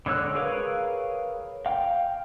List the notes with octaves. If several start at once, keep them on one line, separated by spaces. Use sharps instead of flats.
D3 G#3 C#5 E6 F#6
G#4 A#4 B4 C#5 F5
F5 G5